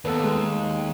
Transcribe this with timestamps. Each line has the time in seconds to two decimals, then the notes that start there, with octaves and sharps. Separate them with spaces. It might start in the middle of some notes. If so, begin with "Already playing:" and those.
0.05 D#2 B3 A4 B4
0.24 G#3